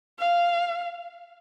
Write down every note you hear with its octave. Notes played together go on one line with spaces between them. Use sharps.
F5